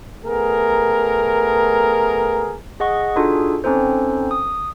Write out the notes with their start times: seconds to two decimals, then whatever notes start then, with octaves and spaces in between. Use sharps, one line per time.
0.25 A3 B3 G#4 A#4
2.80 G#4 D#5 F#5 C#6
3.16 D4 D#4 F4 F#4 G#4 A4
3.64 C4 C#4 D#4 A4 C5
4.31 D#6